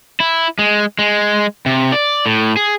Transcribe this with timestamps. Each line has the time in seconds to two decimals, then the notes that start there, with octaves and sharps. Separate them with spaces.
0.20 E4
0.59 G#3
0.99 G#3
1.66 C3
1.92 D5
2.26 A2
2.57 G#4